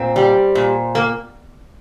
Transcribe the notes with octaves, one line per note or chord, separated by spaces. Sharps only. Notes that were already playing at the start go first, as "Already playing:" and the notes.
Already playing: A#2 C4
G3
A#2
A#3